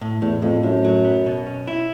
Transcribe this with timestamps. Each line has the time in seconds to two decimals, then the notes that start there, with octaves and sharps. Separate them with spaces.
0.01 A2
0.22 E2 A2
0.42 F2 A2
0.63 F#2 A2
0.84 F#3
1.05 B3
1.26 B2
1.47 C#4
1.67 E4